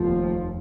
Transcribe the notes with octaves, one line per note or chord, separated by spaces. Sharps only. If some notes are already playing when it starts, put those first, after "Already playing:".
Already playing: F1 D#2 F3